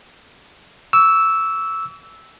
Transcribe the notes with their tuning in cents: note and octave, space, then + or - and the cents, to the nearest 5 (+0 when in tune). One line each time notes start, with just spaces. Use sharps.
C#6 +45 E6 -5